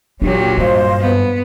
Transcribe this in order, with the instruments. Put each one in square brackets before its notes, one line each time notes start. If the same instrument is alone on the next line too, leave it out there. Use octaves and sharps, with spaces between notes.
[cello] A#2 F#3 [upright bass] D4 D#4 [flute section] G4 C#5
[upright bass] G2 [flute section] C5 D#5 F5
[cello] B3